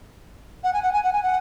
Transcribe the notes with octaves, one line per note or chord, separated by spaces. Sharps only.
F#5
G#5
F#5
G#5
F#5
G#5
F#5